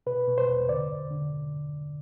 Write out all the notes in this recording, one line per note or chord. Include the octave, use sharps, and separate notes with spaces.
B2 B4
B2
C5
E2
D3 D5
G2
D3